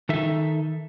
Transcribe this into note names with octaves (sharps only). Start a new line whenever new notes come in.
D#3 D#4 A4 E5